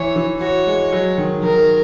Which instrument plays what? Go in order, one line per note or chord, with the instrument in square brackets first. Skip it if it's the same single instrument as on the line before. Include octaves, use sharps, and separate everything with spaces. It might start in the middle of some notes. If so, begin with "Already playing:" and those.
Already playing: [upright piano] E3 [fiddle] C#5
[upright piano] E3
[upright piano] F#4 [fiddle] C#5
[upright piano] G#3
F#3
D#3
[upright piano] D#3 [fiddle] A#4